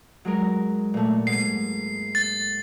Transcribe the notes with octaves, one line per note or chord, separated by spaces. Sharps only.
F#3 G#3 A#4
A#2 A3
G#2 C7
A6